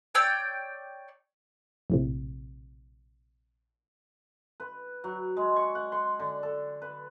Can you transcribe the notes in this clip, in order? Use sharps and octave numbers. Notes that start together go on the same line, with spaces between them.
C#5 D5 G5 E6
A#1 A2 C3
B4
F#3
G#3
C#6
F#5
C6
D3
A4
B4